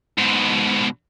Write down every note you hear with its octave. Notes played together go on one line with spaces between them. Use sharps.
G#2 B2